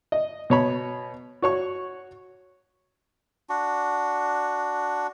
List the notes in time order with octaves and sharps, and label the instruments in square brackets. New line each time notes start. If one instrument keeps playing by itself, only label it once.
[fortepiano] D#5
B2 C#5 B5
F#4 C#5 C#6
[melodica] D4 F#4